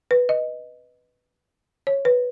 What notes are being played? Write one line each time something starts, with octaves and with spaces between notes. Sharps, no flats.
B4
D#5
C#5
B4